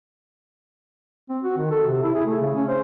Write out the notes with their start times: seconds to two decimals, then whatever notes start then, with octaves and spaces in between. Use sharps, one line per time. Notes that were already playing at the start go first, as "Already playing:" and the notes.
1.29 C4
1.43 F#4
1.57 D#3
1.71 A4
1.86 C3
2.03 E4
2.15 G#4
2.26 A3
2.41 C#3
2.55 C#4
2.68 C5